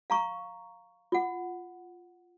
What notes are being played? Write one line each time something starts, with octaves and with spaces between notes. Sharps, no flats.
F5 A#5 C#6
F4 F#5